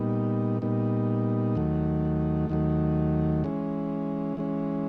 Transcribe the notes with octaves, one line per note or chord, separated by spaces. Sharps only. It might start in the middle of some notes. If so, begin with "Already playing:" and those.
Already playing: A#2 G3 B3 D#4
A#2 G3 B3 D#4
D#2 D#3 F#3 A3
D#2 D#3 F#3 A3
E3 G#3 C#4
E3 G#3 C#4